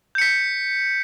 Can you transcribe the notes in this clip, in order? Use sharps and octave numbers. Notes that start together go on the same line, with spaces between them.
G6 B6 C#7